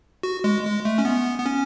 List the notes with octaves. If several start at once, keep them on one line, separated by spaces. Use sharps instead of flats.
F#4
G#3
G#3
A3
C#4
B3
B3
C#4